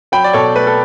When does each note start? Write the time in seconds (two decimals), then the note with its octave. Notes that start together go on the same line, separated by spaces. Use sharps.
0.12 F#3 G5 B5
0.24 D5
0.33 B2 A4 C#5
0.55 A3 B4
0.67 A4